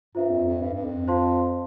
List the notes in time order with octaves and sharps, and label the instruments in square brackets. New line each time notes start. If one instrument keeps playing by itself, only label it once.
[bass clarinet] G2 [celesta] F4 C5 E5
[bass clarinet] F2
F2
G2
G2
F2
[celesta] F4 C5 F5 A5 C6